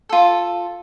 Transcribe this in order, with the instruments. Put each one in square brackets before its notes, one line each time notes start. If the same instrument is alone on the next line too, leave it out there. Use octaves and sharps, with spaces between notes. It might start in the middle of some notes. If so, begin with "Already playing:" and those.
[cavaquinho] F4 A4